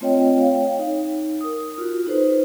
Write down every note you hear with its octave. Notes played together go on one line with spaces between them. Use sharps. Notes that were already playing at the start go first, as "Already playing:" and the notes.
A3 C4 F4 C#5 D#5 G5
C#5 F5 G5
D#4
A#4 D#6
F4 F#4
D#4 A4 B4 C5